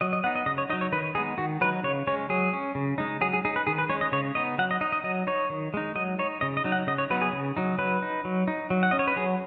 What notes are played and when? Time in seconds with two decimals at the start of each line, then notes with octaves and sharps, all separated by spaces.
0.01 F#3 D#5
0.13 D#5
0.24 B3 F#5
0.26 D#4
0.36 D#5
0.46 C#3 D#5
0.58 C#5
0.70 F#3 D#4 D#5
0.81 C#5
0.92 D#3 B4
1.15 G#3 B3 D#4 G#4
1.38 D#3 F#4
1.61 F#3 D#4 B4
1.84 C#3 C#5
2.07 G#3 C#4 C#5
2.30 F#3 G#4
2.53 C#4
2.75 C#3
2.98 G#3 D#4
3.21 F#3 G#4
3.33 G#4
3.45 D#4 G#4
3.56 B4
3.67 D#3 G#4
3.78 B4
3.90 G#3 C#4 C#5
4.01 D#5
4.12 C#3 C#5
4.35 B3 D#4 D#5
4.59 F#3 F#5
4.71 D#5
4.81 D#4 D#5
4.92 D#5
5.04 F#3 D#5
5.27 D#4 C#5
5.50 D#3
5.74 G#3 D#4
5.96 F#3 D#5
6.19 D#4 C#5
6.41 C#3 D#5
6.57 D#5
6.64 F#3 D#4
6.72 F#5
6.87 C#3 D#5
6.98 C#5
7.10 F#3 B3 D#4 B4
7.22 G#4
7.33 C#3
7.57 F#3 D#4
7.78 F#3 B4
8.02 D#4
8.25 F#3
8.48 D#4
8.70 F#3
8.83 F#5
8.91 C#4 D#5
8.99 C#5
9.07 B4
9.16 F#3 G#4